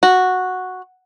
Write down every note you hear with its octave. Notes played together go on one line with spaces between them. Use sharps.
F#4